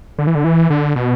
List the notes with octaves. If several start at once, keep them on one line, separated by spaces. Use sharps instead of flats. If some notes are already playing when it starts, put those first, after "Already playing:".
D3
E3
D3
E3
D3
B2